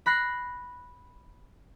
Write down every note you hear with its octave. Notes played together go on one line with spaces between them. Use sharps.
B5 F#6 A#6 C7